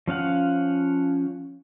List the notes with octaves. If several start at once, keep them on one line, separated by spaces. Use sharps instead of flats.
F3 C#4 F5 F#5